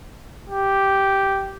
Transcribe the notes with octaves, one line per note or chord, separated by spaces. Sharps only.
G4